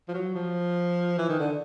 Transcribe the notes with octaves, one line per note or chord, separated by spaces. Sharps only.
F3
F#3
F3
E3
D#3
D3